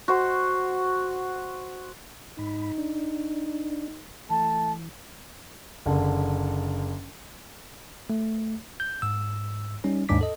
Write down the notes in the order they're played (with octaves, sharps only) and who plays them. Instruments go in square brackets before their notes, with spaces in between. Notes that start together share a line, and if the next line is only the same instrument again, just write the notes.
[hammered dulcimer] F#4 C5
[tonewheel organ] G#2 B5 [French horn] D#4
[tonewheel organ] D4
[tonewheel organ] E3 [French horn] A3 [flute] A5
[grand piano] F#1 D3
[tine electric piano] A3
G6
G#2 E6
G3 C#4 D#4
D#2 G#2 D4 D6 B6
A4 D#5